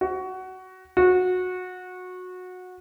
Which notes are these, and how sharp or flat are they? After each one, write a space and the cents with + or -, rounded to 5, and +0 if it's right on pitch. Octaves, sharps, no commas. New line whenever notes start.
F#4 +15
F#4 -20